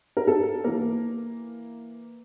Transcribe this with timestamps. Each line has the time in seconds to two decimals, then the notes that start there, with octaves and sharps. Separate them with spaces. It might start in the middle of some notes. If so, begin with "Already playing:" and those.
0.17 A#4
0.27 A4
0.64 E3 A#3 A#4